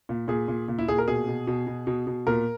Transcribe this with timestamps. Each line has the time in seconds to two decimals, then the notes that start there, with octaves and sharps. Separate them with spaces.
0.09 A#2
0.28 A#2 G#4
0.48 A#2
0.68 A#2
0.79 E4
0.88 A#2 G#4
0.98 A#4
1.08 B2 G#4
1.28 B2
1.47 B2
1.67 B2
1.87 B2
2.07 B2
2.27 A#2 A#4